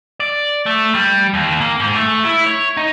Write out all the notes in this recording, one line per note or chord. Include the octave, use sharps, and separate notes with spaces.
D5
A3
G3
D#2
A#3
G#2
A3
E4
C#5
D#4